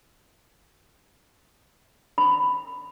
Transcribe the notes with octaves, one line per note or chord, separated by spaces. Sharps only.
B5